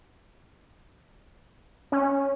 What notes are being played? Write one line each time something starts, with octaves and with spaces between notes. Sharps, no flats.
C#4